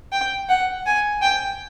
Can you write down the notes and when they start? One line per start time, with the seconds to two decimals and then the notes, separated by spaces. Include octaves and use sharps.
0.12 G5
0.49 F#5
0.86 G#5
1.22 G5